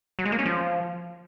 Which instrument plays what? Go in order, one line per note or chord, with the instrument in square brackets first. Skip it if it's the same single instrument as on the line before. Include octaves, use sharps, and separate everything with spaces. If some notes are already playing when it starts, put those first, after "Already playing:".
[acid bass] F#3
G#3
A#3
C#4
F3